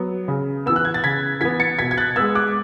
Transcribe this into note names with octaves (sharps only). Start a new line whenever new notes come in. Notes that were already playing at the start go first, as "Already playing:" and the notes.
Already playing: F#3 B3
C#3
E3 B3 E6
F#6
G#6
A6
C#3 G#6 B6
E3 B3 G#6 B6
A6 C#7
B2 G#6 B6
G#6
F#6 A6
G#3 B3 E6 G#6
D6 F#6